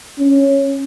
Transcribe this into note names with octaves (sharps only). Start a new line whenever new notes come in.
C#4